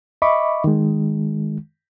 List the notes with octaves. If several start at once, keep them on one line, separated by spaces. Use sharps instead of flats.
D#5 E5 B5 C#6 D6
D#3 G#3